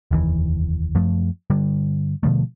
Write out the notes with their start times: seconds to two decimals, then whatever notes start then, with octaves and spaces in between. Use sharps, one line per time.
0.11 F1 D#2 E3
0.95 F#2 F3 A3
1.50 G2 D3 G3
2.23 B2 D3 F3 A3